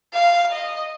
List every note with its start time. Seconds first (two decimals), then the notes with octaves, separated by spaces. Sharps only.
0.14 F5
0.53 D#5